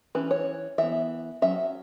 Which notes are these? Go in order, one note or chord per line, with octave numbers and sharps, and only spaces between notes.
E3 C#4 B4
C#5
E3 B3 E5
F#3 C#4 E5